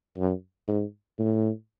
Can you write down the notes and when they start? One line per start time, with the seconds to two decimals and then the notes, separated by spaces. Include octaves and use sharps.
0.17 F#2
0.68 G#2
1.19 A2